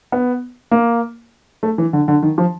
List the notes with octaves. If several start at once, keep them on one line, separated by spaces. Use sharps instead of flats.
B3
A#3
A3
E3
D3
D3
D#3
F3